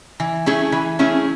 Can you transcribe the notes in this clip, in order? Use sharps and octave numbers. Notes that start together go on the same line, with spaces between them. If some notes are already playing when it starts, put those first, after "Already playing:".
E3
A3 C#4 E4 G#4
E3
A3 C#4 E4 G#4